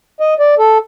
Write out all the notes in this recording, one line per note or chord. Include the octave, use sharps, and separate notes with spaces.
D#5
D5
A4